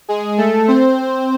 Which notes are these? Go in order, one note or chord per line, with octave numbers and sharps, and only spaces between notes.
G#3 G#4
A3 A4
C4 C5